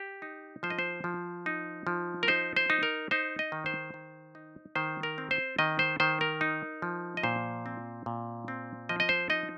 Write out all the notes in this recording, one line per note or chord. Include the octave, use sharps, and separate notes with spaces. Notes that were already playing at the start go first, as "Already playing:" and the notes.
Already playing: G4
D#4
F3 C5
D#5
C5
F3
D#4
F3
A#4
D#4 C5
C5
D#4
A#4
D#4 C5
D#5
D#3
C5
D#3
D#4
D#3 C5
A#4
C4
C5
D#3 D#5
C5
D#3 C5
A#4
D#4
F3
D#5
A#2 C5
C4
A#2
C4
F3 D#5
D#5
C5
D#4 D#5